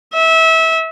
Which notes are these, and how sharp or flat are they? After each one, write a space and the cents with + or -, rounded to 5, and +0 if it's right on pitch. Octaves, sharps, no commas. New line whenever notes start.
E5 -25